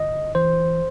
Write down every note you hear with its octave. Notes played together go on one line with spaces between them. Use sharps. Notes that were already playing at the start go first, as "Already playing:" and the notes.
Already playing: G1 D#5
E3 C5